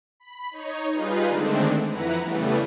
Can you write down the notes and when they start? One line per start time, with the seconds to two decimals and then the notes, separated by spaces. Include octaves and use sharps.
0.20 B5
0.51 D#4 C#5
0.92 G3 D#4 F4 G#4 B4
1.29 D3 D#3 G#3 A3 C4 D4
1.88 F2 E3 E4 B4 F#5 A#5
2.22 C#3 E3 G3 A3 B3